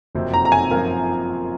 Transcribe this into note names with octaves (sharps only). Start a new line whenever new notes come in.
F#1 F2 C3 F#3 C4
A#5
A#5
G#5
F#2 F3 C4 F4 A#4